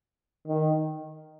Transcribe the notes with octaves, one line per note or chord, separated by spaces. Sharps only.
D#3